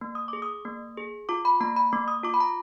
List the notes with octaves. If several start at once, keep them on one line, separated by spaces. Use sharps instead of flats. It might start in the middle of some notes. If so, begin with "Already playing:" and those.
A#3
D#6
G#4 D6
D#6
A#3
G#4
F4 D6
B5
A#3 A#5
B5
A#3 D6
D#6
F4 D6
B5
A#5